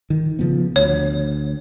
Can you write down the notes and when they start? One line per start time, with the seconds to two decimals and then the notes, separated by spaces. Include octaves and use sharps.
0.10 D#3
0.39 C#3 F3 B3
0.76 D2 C#5